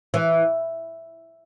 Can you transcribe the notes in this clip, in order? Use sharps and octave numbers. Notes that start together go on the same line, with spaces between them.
E3